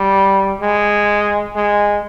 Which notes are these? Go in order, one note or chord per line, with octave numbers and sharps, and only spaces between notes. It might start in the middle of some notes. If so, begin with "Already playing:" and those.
Already playing: G3
G#3
G#3